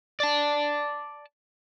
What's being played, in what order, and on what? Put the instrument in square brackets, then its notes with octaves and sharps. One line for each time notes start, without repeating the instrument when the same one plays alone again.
[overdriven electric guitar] D5 A5